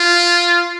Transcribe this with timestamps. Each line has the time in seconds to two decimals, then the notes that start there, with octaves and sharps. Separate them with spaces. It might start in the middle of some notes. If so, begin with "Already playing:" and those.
Already playing: F4